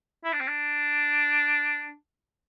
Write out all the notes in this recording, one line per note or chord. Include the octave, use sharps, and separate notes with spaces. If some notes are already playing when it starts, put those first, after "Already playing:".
E4
D4
C4
D4